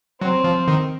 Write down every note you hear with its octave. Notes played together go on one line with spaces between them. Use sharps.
F#3 C4
F3
D#3